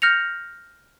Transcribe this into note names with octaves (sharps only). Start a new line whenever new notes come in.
F6 G6 A#6 C#7 F7